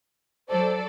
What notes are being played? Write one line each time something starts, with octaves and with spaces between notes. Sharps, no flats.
F#3 A4 C5 D5